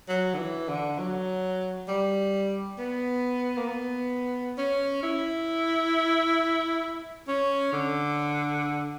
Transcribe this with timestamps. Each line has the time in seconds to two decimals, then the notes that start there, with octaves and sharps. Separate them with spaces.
0.08 F#3
0.34 D3
0.38 E3
0.68 D3
0.98 F#3
1.88 G3
2.78 B3
3.57 A#3
3.68 B3
4.57 C#4
5.03 E4
7.28 C#4
7.72 D3